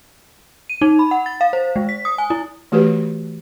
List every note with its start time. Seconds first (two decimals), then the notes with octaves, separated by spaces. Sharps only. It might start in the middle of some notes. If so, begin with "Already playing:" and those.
0.70 D#7
0.81 D#4
0.99 B5
1.11 F#5
1.26 A6
1.41 F5
1.53 C5
1.76 G#3
1.89 B6
2.05 D#6
2.18 G#5
2.30 E4
2.72 E3 A3 F#4 G4 B4